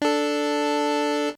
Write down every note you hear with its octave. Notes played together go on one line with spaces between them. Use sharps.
D4 A4